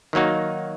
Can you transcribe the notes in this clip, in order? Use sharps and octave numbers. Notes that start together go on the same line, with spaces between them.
D#3 F#3 A#3 D#4 F#4